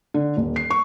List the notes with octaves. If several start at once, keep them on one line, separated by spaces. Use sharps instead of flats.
D3
D#1
C7
C#6